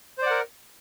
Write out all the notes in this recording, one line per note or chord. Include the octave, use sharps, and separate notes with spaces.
A#4 C5 D5 F#5